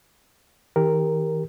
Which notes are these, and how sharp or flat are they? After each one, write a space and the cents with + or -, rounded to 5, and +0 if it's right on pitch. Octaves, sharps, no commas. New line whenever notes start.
D#3 +45 G4 +15 A#4 +0